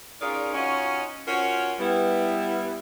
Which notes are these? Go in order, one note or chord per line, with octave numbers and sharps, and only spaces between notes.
C#4 D#4 F4 G#4 A#4 D5
C#4 D#4 F4 F#4 C#5 D#5
C#4 F4 F#4 A#4 C5 C#5
G3 B3 E4